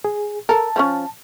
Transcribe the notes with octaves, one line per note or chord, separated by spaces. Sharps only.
G#4
A4 A#4 A5
F3 A3 C#4